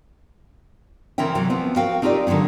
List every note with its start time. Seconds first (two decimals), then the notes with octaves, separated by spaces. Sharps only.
1.18 C#3 E3 C4 A#4 E5 G5
1.35 C3 E3 F#3
1.50 F3 B3 C4
1.76 F#4 A#4 F5 G5
2.02 C4 D#4 F4 G4 A#4 D5
2.27 D3 D#3 F3 F#3 C4